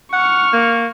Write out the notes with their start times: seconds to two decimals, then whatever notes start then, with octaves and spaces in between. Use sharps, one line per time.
0.13 F#5 C#6 F6
0.53 A#3